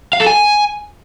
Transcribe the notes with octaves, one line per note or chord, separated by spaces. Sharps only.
F5
A4
G#5